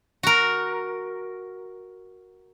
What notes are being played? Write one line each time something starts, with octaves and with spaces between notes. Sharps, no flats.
F#4 A#4